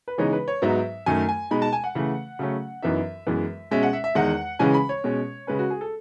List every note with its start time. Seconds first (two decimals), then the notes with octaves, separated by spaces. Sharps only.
0.08 B4
0.18 C#3 E3 G#3 B3 D#4 C#5
0.33 B4
0.48 C#5
0.62 G#2 F#3 B3 D#4 E5
1.06 F#2 D#3 A3 G#5
1.29 G#5
1.51 B2 G#3 D#4 B5
1.62 A5
1.73 G#5
1.84 F#5
1.95 C#3 E3 A3
2.39 C#3 F#3 A3 C#4
2.83 F#2 E3 B3 D#4 E5
3.27 F#2 E3 G#3 B3
3.71 B2 G#3 C#4 E5
3.83 F#5
3.93 E5
4.04 E5
4.15 E2 D#3 G#3 F#5
4.59 C#3 E3 G#3 C#4 G#5
4.74 B5
4.89 C#5
5.04 B2 G#3 C#4
5.47 C#3 G#3 C#4 B4
5.59 F#4
5.70 G#4
5.81 A4